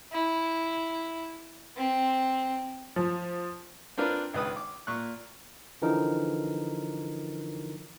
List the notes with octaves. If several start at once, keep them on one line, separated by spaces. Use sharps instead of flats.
E4
C4
F3
C4 D4 F4 A#4 B4 D5
G#1 C#2 B4 D#6
D6
A#2 C#6 F#6
D3 E3 F3 D#4 A#4